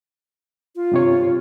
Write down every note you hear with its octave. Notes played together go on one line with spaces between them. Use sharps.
F4
G2 C3 C#5